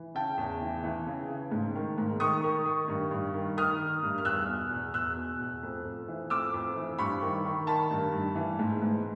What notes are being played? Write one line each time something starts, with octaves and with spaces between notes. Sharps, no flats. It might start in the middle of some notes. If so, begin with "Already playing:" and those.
Already playing: E3
C#3 G5 A5
E2
E3
E3
C#3
C#3
G#2
D#3
G#2
D#3 C#6 D#6
D#3
D#3
G2
G2
D#3
D#3 D#6 F6
D#3
G2
F6
E2 E6 F#6
B2
E2
E2 E6 F#6
B2
E2
F2
F2
E3
F2 D6 E6
F2
E3
G2 B5 C#6
D#3
D#3
D#3 A5 B5
G2
G2
E3
G#2
G#2